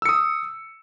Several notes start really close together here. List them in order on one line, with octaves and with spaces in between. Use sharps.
E6 C#7 D#6